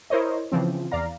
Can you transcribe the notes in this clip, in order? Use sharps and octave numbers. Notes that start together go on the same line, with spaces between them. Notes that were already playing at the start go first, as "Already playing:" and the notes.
E4 A#4 C5 C#5 D#5
C#3 E3 F3 C4
E2 D5 F5 A#5